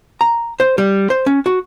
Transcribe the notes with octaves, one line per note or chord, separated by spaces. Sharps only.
A#5
C5
G3
C5
C#4
F#4